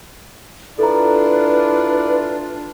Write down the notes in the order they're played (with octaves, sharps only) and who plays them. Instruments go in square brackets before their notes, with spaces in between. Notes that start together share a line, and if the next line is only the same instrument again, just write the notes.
[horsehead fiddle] D4 F4 [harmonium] E4 D5 [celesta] A4 A#5 [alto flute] B4